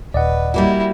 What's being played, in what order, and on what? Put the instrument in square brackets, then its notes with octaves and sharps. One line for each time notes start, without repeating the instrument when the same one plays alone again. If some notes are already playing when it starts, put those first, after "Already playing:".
[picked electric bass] D#1 [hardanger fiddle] B4 [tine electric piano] D5 D#5 F#5
[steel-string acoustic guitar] G3 A#3 F#4 [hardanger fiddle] E4